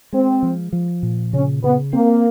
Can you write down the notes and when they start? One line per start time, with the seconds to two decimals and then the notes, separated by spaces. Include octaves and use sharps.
0.13 G#3 C4
0.43 F3
0.73 F3
1.03 A#2
1.33 C#3 C#4
1.63 C#3 B3
1.93 A#3 C4